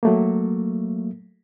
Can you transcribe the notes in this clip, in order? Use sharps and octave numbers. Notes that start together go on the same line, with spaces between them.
F#3 A3 A#3